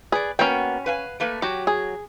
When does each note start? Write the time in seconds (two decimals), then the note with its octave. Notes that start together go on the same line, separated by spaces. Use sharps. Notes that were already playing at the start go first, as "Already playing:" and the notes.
0.12 G#4 B4 D5
0.39 A#3 B3 C#4 F#4 G5
0.86 B4 F5 G#5
1.20 A3 A#3 B4
1.42 F#3 F#4 G4
1.67 G#4